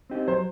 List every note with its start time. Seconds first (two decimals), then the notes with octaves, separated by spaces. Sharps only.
0.10 C4 D#4 G4
0.27 F#3 C5